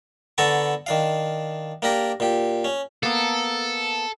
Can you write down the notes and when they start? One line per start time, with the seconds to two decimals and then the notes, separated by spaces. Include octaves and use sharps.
0.38 D3 B3 A4 A5 A#5 C#6
0.86 D#3 D4 F5
1.82 A#3 D4 G4 A#4 A#5
2.20 A#2 G4
2.64 C#4
3.03 A#3 B3 A4